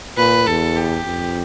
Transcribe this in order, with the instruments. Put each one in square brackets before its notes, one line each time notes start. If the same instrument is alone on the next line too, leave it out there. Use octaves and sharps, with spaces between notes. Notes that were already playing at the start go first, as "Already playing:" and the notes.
[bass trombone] A#2 [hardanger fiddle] B4
[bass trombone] E2 [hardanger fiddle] A4
[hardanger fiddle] G4
[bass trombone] F2